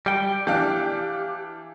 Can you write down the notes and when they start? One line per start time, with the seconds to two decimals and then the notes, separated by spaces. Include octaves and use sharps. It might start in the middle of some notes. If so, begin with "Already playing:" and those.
0.06 G3 G5
0.47 E3 D4 G4 F5